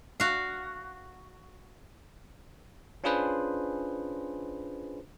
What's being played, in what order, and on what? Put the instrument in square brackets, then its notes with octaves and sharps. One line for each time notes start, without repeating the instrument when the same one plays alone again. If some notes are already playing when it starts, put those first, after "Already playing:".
[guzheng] F#4 F5
[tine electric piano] C#4 D4 F4 G#4 B4 C5